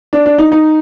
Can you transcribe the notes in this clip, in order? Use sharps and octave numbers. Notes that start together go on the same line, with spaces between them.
D4
D4
D#4
D#4